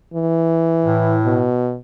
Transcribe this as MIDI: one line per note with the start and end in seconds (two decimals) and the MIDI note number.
0.14 1.18 52
0.85 1.47 45
1.25 1.78 47